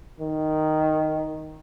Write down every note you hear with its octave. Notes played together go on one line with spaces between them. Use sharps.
D#3